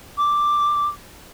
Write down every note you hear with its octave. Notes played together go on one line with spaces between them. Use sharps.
D6